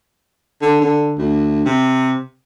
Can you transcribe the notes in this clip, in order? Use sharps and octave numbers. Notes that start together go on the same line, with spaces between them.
D3
D3
D2
C3